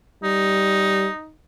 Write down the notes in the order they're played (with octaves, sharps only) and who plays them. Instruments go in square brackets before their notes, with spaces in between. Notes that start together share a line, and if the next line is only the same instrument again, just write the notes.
[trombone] G3 [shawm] D#4